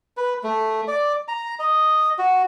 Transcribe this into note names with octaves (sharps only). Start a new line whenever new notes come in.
B4
A3
D5
A#5
D#5
F#4